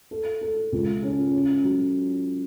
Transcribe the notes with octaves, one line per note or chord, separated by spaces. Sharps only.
A4
A4
C#2
C#4
C#4
F#3